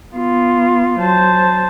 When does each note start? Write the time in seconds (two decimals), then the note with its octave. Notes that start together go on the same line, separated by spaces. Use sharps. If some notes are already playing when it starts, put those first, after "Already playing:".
0.14 B3 F4
1.00 F#3 C5 A5